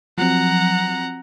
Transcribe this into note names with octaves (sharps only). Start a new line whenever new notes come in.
F3 F#3 C4 F#5 A#5